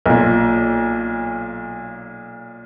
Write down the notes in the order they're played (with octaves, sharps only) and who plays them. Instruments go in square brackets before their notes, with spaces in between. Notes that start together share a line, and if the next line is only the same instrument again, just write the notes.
[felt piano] B1 A#2